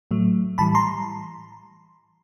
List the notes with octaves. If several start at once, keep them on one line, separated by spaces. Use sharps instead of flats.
A2 F#3 A3
A2 E3 G3 A5 B5
A#5 C6